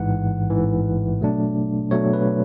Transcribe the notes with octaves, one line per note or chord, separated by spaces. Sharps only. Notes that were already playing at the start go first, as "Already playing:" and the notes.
Already playing: A1 G#2 E3 F#5
A1 G#2 E3
B2 F#3 A3 D4
B2 F#3 A3 D4 C#5
B4